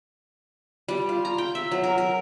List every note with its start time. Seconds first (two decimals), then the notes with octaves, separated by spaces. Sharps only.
0.88 G3
1.09 F4
1.25 A#5
1.38 G5
1.55 E5
1.71 F#3
1.84 A#4
1.98 A#4